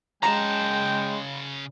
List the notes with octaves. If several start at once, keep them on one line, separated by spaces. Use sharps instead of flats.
C#3 G#3 G5 A5 A#5